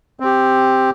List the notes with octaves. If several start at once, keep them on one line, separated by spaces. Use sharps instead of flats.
C4 G4